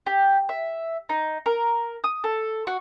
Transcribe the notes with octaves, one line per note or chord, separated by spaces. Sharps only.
G4
E5
D#4
A#4
D#6
A4
F#4